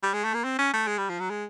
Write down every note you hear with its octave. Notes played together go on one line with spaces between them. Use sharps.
G3
G#3
A3
A#3
C4
C#4
A3
G#3
G3
F3
F#3
G#3